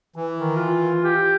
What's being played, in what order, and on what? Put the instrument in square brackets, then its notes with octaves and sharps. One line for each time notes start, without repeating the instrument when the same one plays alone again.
[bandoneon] E3
[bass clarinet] D#3
F4
G4